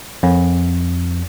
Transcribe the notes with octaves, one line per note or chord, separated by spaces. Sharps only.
F2